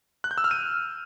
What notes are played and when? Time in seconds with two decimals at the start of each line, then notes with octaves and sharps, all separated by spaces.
0.24 F#6
0.31 G6
0.38 E6
0.44 F6
0.51 D#7